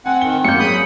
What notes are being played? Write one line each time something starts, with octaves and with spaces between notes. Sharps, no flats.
C4 F#5 G#5
D#3 G7
G#1 F#2 A#3 G6 C#7
F#3 G#3 B5 D#6